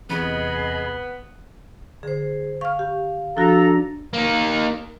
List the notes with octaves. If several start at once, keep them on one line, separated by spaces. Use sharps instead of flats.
E2 C3 B3 G#4 D#5 B5
D3 G#4 C5
F5 C#6 F6
G4
F3 D4 F#4 A4 A#5
A#3 D#4